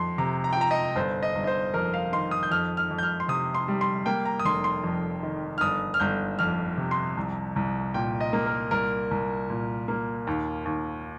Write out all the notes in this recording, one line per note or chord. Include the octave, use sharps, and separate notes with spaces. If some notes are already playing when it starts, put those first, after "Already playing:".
Already playing: F2 C6
C3 A#5
A#5
G5
F3 A#5
D#5
G1 C5
D#5
G1
D#5
C5
F2 A#4
F5
D#3 C6
D#6
G6
F2 F6
F6
F2
G6
F6
C6
C3 D#6
C6
G3
C6
A#3 G5
A#5
D#6
F1 C6
C6
F2
D#3
F6
G1 D#6
F6
G1 G6
F2 F6
C3
C6
C2
C2
A#2 G5
D#5
A#3
A#4
C2 A#4
C2
A#2
A#3
D#2
D#2